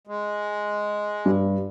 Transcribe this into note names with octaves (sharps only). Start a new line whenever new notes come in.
G#3
G2